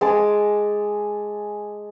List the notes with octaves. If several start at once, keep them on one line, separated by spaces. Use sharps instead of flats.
G#3 G#5 A5 D6